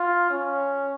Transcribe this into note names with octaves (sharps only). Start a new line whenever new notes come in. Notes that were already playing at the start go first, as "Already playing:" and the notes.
Already playing: F4
C#4